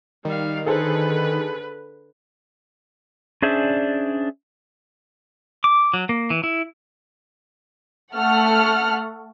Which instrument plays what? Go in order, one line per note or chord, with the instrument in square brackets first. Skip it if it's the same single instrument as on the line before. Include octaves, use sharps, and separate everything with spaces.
[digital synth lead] D#3 [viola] G3 F5
[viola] D3 B4 [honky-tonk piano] G#4 A4 C5
[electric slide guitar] C#4 D4 G#4 C5 D5 E5
[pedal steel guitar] D6
F#3
A#3
E3
E4
[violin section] A3 A4 F#5 F6